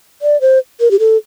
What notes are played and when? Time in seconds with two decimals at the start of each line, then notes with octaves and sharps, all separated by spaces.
0.22 D5
0.41 C5
0.80 A#4
0.91 G4
0.99 A4